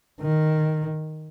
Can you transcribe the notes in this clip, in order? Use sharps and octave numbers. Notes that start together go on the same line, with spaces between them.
D#3